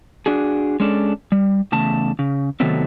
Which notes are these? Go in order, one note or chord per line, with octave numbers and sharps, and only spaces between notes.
D4 F#4 G#4
G#3 C#4 D4 A4
G3
E2 C#3 A3 A5
C#3
C3 D#3 F#3 A3 B3 C4